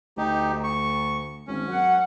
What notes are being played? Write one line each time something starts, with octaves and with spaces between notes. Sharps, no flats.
D2 D#4 G4
C#6
G#1 C#4
F#2 F#5